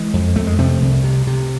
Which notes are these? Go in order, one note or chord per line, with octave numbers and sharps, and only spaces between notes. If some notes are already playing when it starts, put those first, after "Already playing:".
Already playing: E3 G#3
F2
F2 A3
G#3
C3 F3 A3
C2
C3
C3